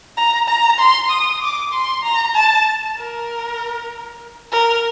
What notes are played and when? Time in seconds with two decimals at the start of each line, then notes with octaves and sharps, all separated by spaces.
0.17 A#5
0.48 A#5
0.79 C6
1.10 D#6
1.41 D6
1.72 C6
2.03 A#5
2.35 A5
2.97 A#4
4.52 A#4